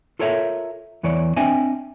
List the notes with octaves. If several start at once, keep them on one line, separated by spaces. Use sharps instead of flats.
F4 A4 A#4 C#5 D#5 E5
E2 E3 C#5 D5
C4 D4 D#5 E5 G#5